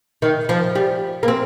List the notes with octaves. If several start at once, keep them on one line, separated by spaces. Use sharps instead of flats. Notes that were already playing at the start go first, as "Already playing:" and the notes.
D#3
F3
G3
A#3
C4